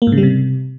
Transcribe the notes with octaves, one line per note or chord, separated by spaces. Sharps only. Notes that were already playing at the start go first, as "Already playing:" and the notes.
A#3
G#2
C#3
G3
C3